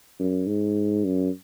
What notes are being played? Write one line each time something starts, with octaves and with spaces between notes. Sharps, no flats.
F#2
G#2
F#2